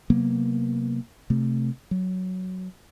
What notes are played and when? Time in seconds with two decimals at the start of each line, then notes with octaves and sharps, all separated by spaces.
0.10 C3 F#3 A#3 B3
1.30 C3 A3
1.91 F#3